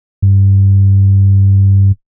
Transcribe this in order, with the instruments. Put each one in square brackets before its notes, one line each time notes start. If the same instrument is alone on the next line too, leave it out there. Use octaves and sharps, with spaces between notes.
[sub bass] G2